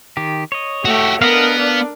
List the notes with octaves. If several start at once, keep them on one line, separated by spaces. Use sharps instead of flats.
D#3 G4
C#5 D#5
A3 F#4 G4
B3 D4 A#4 D#5 F5
D4 F5